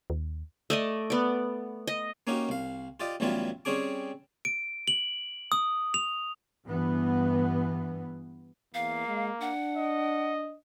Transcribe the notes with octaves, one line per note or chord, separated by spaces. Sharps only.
D#2
A3 D5 D#5
B3 D5
D#5
A#3 C#4 D#4 F#4 G4
C2 F5
F4 G4 D5 D#5
A1 E3 F#3 G3 B3 F4
G3 C4 C#4 G#4 D6
D7
F#7
D#6
F7
G2 E3 B3
E2 A#3 F5
G#3
D4 F#5
D#5